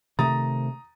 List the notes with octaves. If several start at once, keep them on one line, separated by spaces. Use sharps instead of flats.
C3 D#3 A3 A#5 D#6 A6